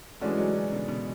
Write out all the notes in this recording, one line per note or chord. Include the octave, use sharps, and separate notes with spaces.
E3 G#3 A3 C#4 D4 F#4
F#3 A3
D3 F#3
B2 D3
B2 D3